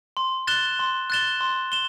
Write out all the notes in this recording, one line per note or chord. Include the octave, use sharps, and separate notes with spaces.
C6
F#6 A6 E7 G7
C6
F#6 A6 E7 G7
C6
E7 G7